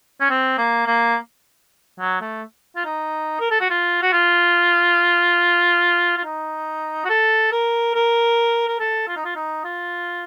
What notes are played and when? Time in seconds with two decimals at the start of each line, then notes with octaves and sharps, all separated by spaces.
0.21 C#4
0.30 C4
0.58 A#3
0.87 A#3
2.00 F#3
2.21 A3
2.76 F4
2.85 D#4
3.40 A#4
3.51 A4
3.61 F#4
3.70 F4
4.02 F#4
4.12 F4
6.17 F4
6.25 D#4
7.05 F#4
7.10 A4
7.52 A#4
7.94 A#4
8.68 A#4
8.80 A4
9.08 F4
9.17 D#4
9.25 F4
9.36 D#4
9.64 F4